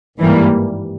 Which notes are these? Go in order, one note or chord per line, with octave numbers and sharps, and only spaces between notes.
G#1 G2 E3 G3 A#3